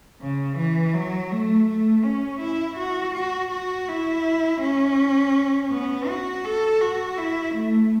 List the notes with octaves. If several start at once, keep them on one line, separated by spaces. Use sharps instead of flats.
C#3
E3
F#3
A3
A3
C#4
E4
F#4
F#4
F#4
E4
C#4
B3
F#4
A4
F#4
E4
A3